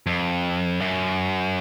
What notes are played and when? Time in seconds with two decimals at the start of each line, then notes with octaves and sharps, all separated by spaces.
0.06 F2
0.80 F#2